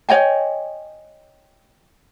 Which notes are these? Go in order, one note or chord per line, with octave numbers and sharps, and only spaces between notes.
C#5 D#5 G5 G#5